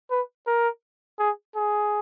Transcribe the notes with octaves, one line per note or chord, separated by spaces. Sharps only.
B4
A#4
G#4
G#4